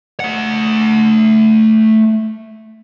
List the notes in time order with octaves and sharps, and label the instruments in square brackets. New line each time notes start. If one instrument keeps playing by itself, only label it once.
[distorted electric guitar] A3 F#5